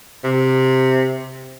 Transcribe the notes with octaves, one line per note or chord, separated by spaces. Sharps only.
C3